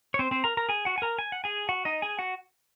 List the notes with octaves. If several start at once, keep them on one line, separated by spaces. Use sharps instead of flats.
C#5
C4 C5
C4 C5
A#4 A#5
A#4 A#5
G#4 G#5
F#4 F#5
G#5
A#4 A#5
G#5
F#5
G#4 G#5
F#4 F#5
D#4 D#5
G#4 G#5
F#4 F#5